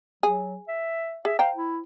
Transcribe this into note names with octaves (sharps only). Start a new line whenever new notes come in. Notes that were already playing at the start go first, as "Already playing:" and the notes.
F#3 G#4
E5
G#4 E5
C5 F5 G5 A#5
E4